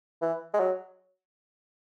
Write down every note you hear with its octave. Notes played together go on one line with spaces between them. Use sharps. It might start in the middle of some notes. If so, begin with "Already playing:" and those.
E3
G#3
F#3